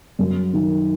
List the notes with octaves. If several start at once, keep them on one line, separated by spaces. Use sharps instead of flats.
F#2
D#3